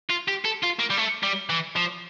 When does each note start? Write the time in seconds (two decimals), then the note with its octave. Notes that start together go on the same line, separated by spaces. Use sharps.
0.10 F4
0.28 G4
0.45 A4
0.63 F4
0.79 A#3
0.90 G3
0.97 A3
1.23 G3
1.49 E3
1.76 F3